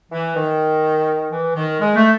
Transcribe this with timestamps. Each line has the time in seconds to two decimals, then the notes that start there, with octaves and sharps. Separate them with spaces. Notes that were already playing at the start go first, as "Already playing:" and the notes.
0.12 E3
0.36 D#3
1.32 E3
1.55 D#3
1.80 G#3
1.96 A3